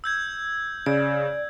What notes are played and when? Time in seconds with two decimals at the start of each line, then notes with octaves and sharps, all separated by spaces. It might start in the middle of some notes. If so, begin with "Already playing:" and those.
0.04 E6 G6 G#6
0.86 C#3 D5